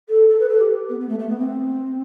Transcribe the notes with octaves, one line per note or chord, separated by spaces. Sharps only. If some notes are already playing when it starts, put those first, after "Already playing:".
A4
A4
B4
A4
G4
B3
B3
A3
A3
B3
C4